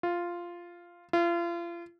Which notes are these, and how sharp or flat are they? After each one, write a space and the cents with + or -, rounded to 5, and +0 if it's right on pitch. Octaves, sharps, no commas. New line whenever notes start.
F4 -5
F4 -35